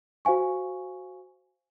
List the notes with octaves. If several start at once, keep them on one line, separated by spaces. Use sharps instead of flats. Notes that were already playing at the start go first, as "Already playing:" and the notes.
F#4 C5 F5 G#5 C#6